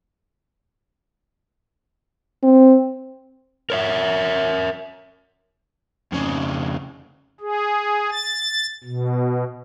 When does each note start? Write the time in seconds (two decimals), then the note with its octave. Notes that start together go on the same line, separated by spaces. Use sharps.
2.43 C4
3.70 A#4 C#5 E5
6.12 F2 C#3
7.40 G#4
8.12 A6
8.84 B2